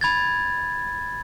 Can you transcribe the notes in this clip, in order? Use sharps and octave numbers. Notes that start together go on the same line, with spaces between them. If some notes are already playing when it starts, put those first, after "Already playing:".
B5 G#6 A6